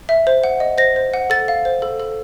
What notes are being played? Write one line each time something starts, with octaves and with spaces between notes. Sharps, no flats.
E5
C5
F#5
D#5
C5 A#6
C5
F#5
A4 A6
F5
C5
A4
A4